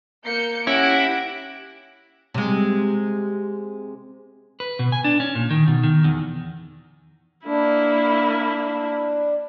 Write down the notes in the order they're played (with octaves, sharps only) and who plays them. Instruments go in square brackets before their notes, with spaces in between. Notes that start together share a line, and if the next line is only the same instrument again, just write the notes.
[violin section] A#3 G6 C#7
[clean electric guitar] C#4 [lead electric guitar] E4 [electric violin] G4 F#5 [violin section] A#6 D7
[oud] C3 G#3
[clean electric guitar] B4
B2
G#5
D4
C#4
A#2
D#3
B2
D#3
E2
[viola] A#3 E4 [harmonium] D4